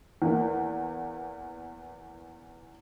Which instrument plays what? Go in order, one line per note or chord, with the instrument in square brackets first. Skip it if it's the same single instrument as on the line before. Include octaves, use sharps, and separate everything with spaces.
[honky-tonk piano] E2 A#3